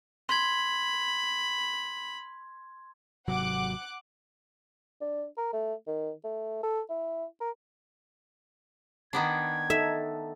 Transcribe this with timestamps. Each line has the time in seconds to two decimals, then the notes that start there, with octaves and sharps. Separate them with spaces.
0.29 B5 C6 G#6
3.28 G#1 C3 F#3 F#5 D6 F#6
5.01 D4
5.37 A#4
5.53 A3
5.87 D#3
6.24 A3
6.63 A4
6.90 E4
7.41 A#4
9.13 D#3 B3 D4 G#6
9.70 D#4 A4 E5